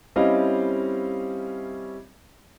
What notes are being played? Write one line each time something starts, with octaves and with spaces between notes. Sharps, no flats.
G3 C4 C#4 E4 D#5 F5